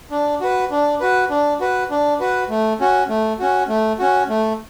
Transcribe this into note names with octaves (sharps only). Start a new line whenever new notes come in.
D4
F#4 B4
D4
F#4 B4
D4
F#4 B4
D4
F#4 B4
A3
C#4 F#4
A3
C#4 F#4
A3
C#4 F#4
A3